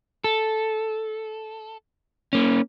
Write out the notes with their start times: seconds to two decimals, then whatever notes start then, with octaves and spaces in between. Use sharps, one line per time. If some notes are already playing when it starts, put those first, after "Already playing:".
0.24 A4
2.33 A#3 C#4